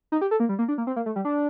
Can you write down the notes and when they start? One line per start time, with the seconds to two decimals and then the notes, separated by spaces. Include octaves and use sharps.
0.12 D#4
0.21 G4
0.31 A4
0.40 A#3
0.49 G3
0.59 A#3
0.68 D4
0.78 A#3
0.87 C4
0.96 A#3
1.06 A3
1.16 G3
1.25 D4